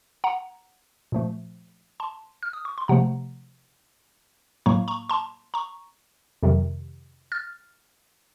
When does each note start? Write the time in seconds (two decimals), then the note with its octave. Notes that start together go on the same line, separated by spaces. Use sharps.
0.24 F#5 A#5
1.12 A#2 F3 A3
2.00 A5 C6
2.43 F6
2.53 D#6
2.65 C#6
2.78 C6
2.88 C3 F3 A3 F#5 A#5
4.66 A2 F#3 A#3 A#5 C#6
4.88 A#5 C#6
5.10 A5 C6
5.54 A#5 C#6
6.43 F2 C3 D#3 F#3
7.32 F6 A6